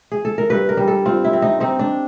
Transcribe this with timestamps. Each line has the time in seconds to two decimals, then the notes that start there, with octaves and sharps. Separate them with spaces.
0.12 G#4
0.25 A4
0.38 A#4
0.50 G2 B4
0.69 A#4
0.77 G3
0.87 A4
1.06 C4 F4
1.24 E4
1.33 C4
1.42 D#4
1.60 C4 D#4
1.79 D4